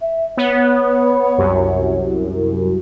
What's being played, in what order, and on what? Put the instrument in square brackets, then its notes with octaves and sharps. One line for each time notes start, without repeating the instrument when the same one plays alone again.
[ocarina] E5
[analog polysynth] B3 [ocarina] C#5
[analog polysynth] C2 F#2